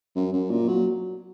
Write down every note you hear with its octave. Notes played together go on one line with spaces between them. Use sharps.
F#2
F#2
A#2
F#3